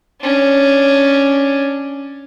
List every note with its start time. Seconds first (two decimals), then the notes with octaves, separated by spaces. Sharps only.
0.21 C#4 D4